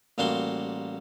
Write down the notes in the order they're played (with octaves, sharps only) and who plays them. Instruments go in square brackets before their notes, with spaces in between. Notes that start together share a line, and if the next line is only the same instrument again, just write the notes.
[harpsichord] A1 G3 A#3 F#4 A5 C6